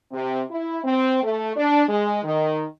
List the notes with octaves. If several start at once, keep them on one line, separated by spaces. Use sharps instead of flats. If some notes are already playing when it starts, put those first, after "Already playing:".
C3
E4
C4
A3
D4
G#3
D#3